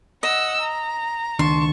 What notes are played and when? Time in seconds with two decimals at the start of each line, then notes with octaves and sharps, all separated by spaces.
0.23 D#5 F#5 E6
0.61 A#5
1.39 C#2 D#3 D4 A5 C6 C#6